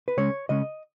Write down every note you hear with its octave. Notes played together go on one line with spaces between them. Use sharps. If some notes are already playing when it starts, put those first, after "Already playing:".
B4
C#3 G#3 C#4 C#5
C#3 G#3 C#4 D#5